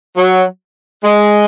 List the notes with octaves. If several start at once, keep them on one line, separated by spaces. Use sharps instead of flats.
F#3
G#3